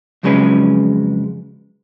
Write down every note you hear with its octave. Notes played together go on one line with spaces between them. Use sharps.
F2 C#3 F#3 G#3 C#4 B4